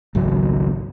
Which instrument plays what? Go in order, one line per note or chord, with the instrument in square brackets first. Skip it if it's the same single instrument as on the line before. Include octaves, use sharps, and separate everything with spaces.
[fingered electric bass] G#1 C#2 F#3